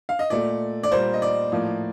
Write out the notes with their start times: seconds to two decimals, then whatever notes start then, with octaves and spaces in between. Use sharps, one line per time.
0.09 F5
0.19 D#5
0.30 A#2 A3 D5
0.83 D5
0.91 A#2 G3 A#3 C5
1.13 D#5
1.22 D5
1.52 A2 F3 A#3